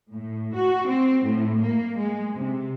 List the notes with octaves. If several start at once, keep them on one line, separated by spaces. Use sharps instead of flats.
A2
F#4
C4
A2
A#3
G#3
C3